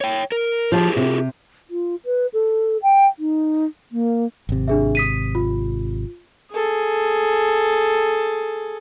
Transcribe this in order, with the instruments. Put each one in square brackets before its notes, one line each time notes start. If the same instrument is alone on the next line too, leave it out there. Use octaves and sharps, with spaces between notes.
[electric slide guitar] C#5 G5
A#4
[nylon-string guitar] F3 [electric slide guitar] F4 G4 G#4
[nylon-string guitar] C3
[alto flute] F4
B4
A4
G5
D#4
A#3
[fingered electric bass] G#1 C3
[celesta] D4 G#4 E5
D#6 B6 D#7
F4
[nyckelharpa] G#4 A4